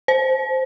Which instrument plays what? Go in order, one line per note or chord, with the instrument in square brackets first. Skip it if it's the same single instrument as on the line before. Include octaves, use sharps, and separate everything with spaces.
[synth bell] C5